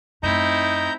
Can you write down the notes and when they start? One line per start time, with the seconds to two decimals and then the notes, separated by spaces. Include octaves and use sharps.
0.23 F#2 A3 C4 D#4 E4 A#5 G6